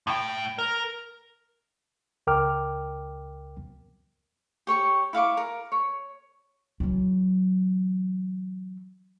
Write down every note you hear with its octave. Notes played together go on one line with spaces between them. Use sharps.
A2 G5
A#4
C#2 A#4 G5 D6 F6
G4 C#5 C#6
E4 F5 C#6 D6
A#4
C#5
E3 F#3